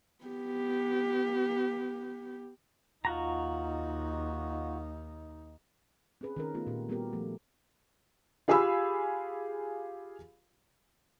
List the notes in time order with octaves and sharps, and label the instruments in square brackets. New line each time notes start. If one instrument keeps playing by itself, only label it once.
[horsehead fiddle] B3 G4
[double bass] D#2 D#4 [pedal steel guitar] F4 F#4 A#5
[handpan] C4 C#4 G#4 B4
D#3 C#4 A#4
A3 B3 F4
A#2 G4
G3 B3 F#4 G4 A#4
F3 A3
[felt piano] F4 G4 G#4 F5 B5 E6